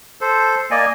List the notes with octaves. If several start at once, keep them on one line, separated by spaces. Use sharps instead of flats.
A4 C5
A#3 D5 D#5 G#5